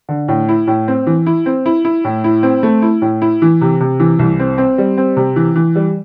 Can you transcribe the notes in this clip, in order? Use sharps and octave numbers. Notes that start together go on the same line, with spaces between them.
D3
A2
E4
A2
C4
E3
E4
C4
E4
E4
A2
E4
C4
A3
E4
A2
E4
E3
C3
C3
E3
C2
C4
C4
G3
C4
C3
E3
E3
G3